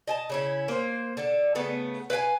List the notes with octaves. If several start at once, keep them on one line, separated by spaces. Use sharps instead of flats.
D#5 G#5 A5
C#3 C#4 E4
A#3 C5
D3 A4
C#3 A3 B3
B4 F5 G5 G#5